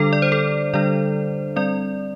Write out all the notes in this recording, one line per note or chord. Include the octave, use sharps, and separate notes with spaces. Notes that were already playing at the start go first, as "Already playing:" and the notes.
Already playing: D3 G3 D4 A4
D5
C5
A4
D3 G3 D4 D5
G3 C4 D5